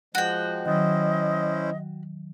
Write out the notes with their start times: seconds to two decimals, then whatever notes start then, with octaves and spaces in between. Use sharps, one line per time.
0.15 F3 G#3 F#4 G5
0.66 D#3 F#3 C#4 E4 C5 D#5